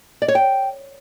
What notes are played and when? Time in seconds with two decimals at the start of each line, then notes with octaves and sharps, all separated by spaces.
0.22 D5
0.28 C#5
0.35 G5